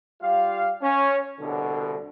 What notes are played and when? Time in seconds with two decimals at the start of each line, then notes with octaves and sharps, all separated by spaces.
0.21 G3 F4 G4 F5
0.82 C#4
1.40 C2 B2 D3